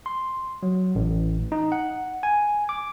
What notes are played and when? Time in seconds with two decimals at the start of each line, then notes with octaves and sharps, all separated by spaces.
0.06 C6
0.63 F#3
0.95 A1
1.52 D#4
1.72 F#5
2.23 G#5
2.69 D6